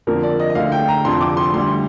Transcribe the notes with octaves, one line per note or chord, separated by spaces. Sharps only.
F2 D3 F3 A#3 A#4
D5
D#5
D#5
D2 D3 A3 F5
G5
A#5
F1 F2 D3 F3 C6
D6
C6
D2 D3 G3 C6